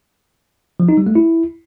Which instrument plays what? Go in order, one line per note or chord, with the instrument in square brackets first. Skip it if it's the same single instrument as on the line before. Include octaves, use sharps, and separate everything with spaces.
[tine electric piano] F3
D#4
G3
A3
E4